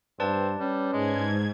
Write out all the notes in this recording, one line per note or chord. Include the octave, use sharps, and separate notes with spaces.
G2 C4 B4 D5 A5
G3 C#4
G#2 G#3 G#6